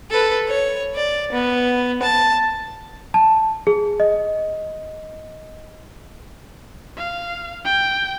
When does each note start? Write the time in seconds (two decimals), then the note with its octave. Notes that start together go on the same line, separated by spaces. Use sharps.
0.10 A4 B4
0.48 C#5
0.95 D5
1.32 B3
2.02 A5
3.14 A5
3.67 G#4
4.00 D#5
6.97 F5
7.65 G5